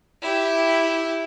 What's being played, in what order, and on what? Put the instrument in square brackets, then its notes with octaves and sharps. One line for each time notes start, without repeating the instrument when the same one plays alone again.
[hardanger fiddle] E4 G4